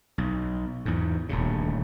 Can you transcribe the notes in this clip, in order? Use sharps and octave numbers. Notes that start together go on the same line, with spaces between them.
B1
E2 G#2
D#1 D2 C#3